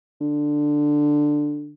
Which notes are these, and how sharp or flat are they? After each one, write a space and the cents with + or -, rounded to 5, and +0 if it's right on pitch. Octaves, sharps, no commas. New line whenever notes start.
D3 +10